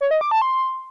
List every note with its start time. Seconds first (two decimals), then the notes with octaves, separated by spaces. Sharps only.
0.01 C#5
0.11 D#5
0.21 D6
0.31 A5
0.42 C6